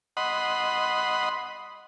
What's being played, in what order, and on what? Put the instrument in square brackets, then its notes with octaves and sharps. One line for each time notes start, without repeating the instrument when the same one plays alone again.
[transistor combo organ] D#5 F#5 B5 C6